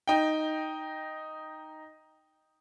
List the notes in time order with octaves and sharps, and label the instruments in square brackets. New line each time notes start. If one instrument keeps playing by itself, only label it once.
[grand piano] D#4 G5